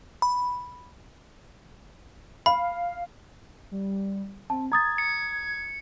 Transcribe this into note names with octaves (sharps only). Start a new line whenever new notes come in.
B5
F5 B5
G3
C4 A5
A#5 D#6 G#6 A6
C#7